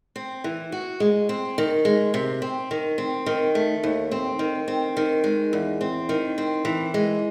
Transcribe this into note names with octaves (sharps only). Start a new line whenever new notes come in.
C4
E3
F#4
G#3
C4
D#3
G#3
C3
C4
D#3
C4
D#3
A3
D#2
C4
D#3
C4
D#3
G#3
E2
C4
D#3
C4
E3
G#3